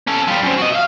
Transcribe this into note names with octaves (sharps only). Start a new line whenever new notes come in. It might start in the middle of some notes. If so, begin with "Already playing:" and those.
C#4 A4
G3 F4
F#2 C3
F#4 D#5
E5 F5